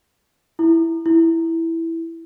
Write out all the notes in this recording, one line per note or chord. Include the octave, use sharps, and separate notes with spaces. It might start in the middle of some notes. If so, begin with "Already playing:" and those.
E4
E4